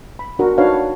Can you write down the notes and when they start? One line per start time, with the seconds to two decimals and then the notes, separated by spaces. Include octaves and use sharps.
0.19 B5
0.39 D4 F#4 A#4
0.58 D4 D#4 F#4 B4 C#5 F5